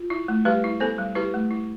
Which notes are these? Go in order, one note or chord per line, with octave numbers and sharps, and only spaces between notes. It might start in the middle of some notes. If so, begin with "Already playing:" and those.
Already playing: F4
E4
A3
G3 G4 B4
E4
B3 A4 C5
G3
E4 G4 B4
A3
E4